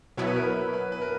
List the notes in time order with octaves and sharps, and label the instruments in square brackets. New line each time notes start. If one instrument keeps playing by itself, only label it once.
[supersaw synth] B2 F#3 B3 E4 [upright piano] C#5
[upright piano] B4
A#4
B4
B4
A#4